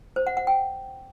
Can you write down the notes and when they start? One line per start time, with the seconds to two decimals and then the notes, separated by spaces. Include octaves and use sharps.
0.16 C5
0.27 F#5
0.37 F#5
0.47 G5